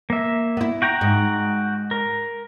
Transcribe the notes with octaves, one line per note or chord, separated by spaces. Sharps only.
A#3 E5
B3 E4
F#4 G5 A#5
G#2
A#4